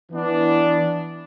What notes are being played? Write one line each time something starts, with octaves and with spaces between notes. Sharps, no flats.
E3 B3 D4